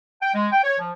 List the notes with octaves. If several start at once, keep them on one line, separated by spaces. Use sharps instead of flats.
G5
G#3
G5
C#5
F3